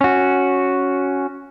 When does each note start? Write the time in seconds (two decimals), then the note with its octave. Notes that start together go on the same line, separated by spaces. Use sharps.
0.01 C#4 F#4